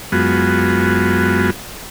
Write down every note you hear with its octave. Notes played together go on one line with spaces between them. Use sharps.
F#2 G#3 B3 F4 F#4